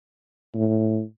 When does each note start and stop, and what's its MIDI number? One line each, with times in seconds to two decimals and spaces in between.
0.55 1.02 45